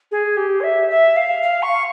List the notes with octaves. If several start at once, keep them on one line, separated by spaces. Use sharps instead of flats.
G#4
G4
C#5
E5
E5
F5
F5
C#6